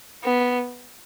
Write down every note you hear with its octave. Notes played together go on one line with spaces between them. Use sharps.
B3